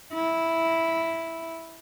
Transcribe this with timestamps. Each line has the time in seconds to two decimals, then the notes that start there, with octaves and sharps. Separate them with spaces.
0.14 E4